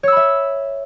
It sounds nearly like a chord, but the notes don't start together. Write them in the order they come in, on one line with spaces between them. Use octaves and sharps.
C#5 E6 B5 E5